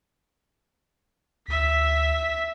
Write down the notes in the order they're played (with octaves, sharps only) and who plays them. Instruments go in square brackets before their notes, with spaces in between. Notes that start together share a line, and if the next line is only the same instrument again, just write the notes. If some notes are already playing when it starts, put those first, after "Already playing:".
[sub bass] D2 [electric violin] E5 B6